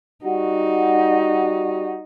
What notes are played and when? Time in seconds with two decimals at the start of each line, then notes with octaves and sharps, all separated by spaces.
0.25 G3 D#4 F#4